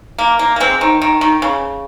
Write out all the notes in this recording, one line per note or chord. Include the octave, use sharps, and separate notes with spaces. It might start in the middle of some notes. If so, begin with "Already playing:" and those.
A#3
A#3
A#3
G#3 C4
D#3
D#3
D#3
C#3